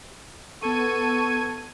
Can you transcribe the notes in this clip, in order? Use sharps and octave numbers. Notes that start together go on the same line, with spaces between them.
B3 A4 C#6 G#6 D#7